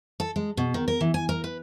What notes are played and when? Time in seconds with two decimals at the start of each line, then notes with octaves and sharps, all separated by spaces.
0.20 A4
0.36 G#3
0.57 B2
0.74 D#3
0.88 A#4
1.01 E3
1.14 G#5
1.29 A#4
1.44 B4